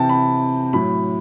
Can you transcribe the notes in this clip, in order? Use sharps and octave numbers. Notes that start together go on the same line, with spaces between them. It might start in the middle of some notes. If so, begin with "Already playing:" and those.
Already playing: C3 E3 G5 A5
B5
A2 F#3 B5